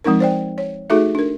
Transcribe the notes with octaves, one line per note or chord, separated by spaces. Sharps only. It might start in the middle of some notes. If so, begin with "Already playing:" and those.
F3 G#3 C4 D#4 A#4
C5 D5 G5
C#5
A3 D#4 F#4 G#4 A4 E5
D4 A#4